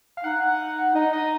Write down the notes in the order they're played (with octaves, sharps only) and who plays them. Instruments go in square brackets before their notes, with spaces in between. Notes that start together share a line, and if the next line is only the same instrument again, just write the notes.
[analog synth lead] F5
[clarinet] D#4 [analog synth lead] F#5
[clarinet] D#4 [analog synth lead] D#5
[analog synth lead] D#5